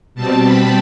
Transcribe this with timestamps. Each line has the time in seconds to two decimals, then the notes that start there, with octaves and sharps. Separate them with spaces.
0.15 B2 G3 C4 A5
0.44 B5